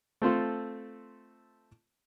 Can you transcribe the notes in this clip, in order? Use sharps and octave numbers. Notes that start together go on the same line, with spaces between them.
A3 C4 F4 A4